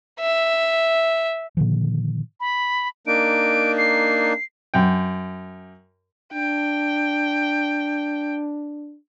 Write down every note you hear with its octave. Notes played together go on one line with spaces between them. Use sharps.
E5
A#2 D3 D#3 F3
B5
A#3 D4 D#4 D7
C7
F#2 G5
D4 G5